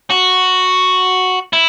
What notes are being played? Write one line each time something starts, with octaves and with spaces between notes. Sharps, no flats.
F#4
E4